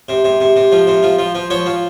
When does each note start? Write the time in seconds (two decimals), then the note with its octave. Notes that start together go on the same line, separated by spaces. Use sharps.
0.09 C3
0.24 C3
0.41 C3
0.56 C3
0.72 F3
0.87 C3
1.03 F3
1.18 F3
1.35 F3
1.50 F3 C#5
1.66 F3